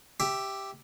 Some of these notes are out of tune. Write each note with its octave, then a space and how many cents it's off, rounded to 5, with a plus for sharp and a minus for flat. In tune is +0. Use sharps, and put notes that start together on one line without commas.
G4 +0 E5 +0